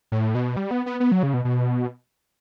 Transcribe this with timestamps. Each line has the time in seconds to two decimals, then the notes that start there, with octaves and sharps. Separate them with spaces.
0.12 A2
0.35 B2
0.56 G3
0.71 B3
0.86 B3
1.00 B3
1.12 F#3
1.23 C#3
1.34 B2
1.45 B2